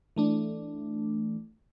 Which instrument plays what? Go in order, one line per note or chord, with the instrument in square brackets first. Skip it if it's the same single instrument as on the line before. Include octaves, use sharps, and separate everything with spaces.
[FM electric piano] E3 A3 D4